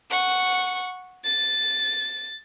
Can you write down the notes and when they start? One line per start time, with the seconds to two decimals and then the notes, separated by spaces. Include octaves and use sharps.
0.10 F#5 C#6
1.24 A6